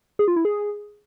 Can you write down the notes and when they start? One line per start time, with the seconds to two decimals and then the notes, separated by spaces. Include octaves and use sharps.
0.19 G#4
0.28 F4
0.36 E4
0.45 G#4